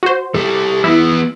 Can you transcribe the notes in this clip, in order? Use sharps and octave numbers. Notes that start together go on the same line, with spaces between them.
F#4 C5
G3 E4 A4
E3 B3 E4 E6